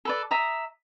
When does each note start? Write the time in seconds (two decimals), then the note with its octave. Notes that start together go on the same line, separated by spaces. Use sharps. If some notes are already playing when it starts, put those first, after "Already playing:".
0.05 A4 B4 D5
0.31 E5 A#5 D#6